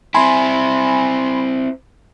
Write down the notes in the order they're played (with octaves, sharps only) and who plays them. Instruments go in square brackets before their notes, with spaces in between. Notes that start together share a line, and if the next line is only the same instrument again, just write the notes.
[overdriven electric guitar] C4 E4 [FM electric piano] G#5 B5 C6